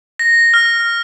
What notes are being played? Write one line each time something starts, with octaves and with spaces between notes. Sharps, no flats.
A#6
F6